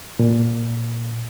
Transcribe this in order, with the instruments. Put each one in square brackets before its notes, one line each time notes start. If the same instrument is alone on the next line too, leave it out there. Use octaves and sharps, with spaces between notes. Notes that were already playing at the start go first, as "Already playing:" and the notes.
[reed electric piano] A#2